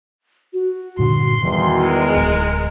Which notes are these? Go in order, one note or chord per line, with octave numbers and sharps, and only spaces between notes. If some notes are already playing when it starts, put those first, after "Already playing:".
F#4
G2 A#2 D3 C6
E2 D#3 E3 G3
G#3 A#4
D1